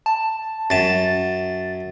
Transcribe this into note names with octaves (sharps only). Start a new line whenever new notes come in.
A5
F#2 A5 A6